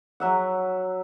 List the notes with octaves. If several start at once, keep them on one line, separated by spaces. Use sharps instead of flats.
F#3 E5 F#5